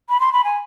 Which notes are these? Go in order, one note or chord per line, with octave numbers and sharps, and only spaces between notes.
B5
C6
B5
G#5